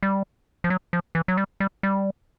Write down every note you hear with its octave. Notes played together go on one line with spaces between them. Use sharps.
G3
F3
F#3
F3
E3
F#3
G3
G3
G3